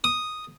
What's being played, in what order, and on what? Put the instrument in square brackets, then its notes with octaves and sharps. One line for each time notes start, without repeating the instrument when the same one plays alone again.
[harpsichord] D#6